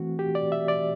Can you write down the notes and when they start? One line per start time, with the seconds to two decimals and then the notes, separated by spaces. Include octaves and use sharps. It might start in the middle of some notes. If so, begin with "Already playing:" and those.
Already playing: E3 A3 C4 F#4
0.19 G4
0.35 D5
0.52 E5
0.68 D5